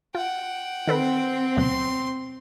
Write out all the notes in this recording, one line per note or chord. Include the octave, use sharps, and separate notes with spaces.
F4 F#5 G5
D#3 C4 A4 B4
D2 B2 F#3 C6